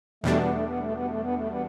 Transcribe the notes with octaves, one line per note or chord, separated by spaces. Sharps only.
E2 B2 G3 A3 D4
B3
A3
B3
A3
B3
A3
B3
A3
B3